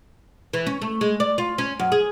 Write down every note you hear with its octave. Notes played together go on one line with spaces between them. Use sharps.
E3
C#4
A3
G#3
D5
F4
C#4
F#2
G#4